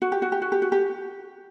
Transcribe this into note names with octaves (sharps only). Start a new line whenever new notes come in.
F#4
G4
F#4
G4
F#4
G4
F#4
G4